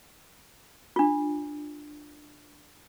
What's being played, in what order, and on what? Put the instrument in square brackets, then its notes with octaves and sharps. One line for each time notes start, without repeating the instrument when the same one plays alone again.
[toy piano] D4 F4